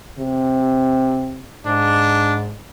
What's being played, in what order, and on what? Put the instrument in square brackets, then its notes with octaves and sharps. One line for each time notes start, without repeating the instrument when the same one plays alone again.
[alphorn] C3
[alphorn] G#2 [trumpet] D4